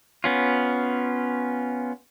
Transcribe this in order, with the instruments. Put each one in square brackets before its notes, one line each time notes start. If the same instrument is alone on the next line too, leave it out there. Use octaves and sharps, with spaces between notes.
[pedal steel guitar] B3 C#4 F4